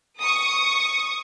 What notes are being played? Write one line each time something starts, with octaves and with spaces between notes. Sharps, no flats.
C#6 D#6